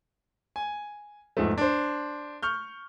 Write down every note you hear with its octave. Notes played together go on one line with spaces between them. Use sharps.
G#5
E2 G#2 F3 A3
D4 C5
C#6 F6 G6